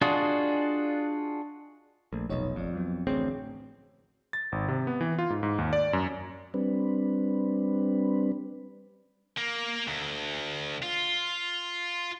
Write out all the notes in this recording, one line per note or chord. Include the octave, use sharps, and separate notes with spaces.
D4 F4 F#4 G#4 D#5
A#1 A3
F1 B1 D#4 C#5 D#5
G1 F2 F3 D5
F3 F#3 B3
A1 D2 C4 G#4 C#5
A6
G#1
C3
B3
E3
F4
G#2
G#2
D#2
D5
F#2
G3 C4 D4 B4
A#3
D2
F4